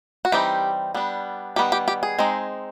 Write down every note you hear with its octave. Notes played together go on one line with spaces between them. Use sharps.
F#4
E3 G3 C4 D#4 G4
G3 B3 D4
D#3 G3 B3 G4
G4
G4
G#4
G#3 C4 D#4